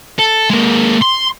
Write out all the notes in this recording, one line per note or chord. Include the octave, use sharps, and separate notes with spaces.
A4
G#3 A#3
C6